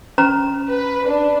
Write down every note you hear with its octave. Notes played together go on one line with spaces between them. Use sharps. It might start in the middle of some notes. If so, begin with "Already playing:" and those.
C#4 C5 A#5
B4
D4